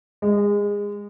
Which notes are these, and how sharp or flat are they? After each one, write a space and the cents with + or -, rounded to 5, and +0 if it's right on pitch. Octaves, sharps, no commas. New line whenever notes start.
G#3 -25